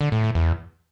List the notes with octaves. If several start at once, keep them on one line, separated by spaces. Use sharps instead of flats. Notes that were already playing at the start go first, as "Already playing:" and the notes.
D3
A2
A2
E2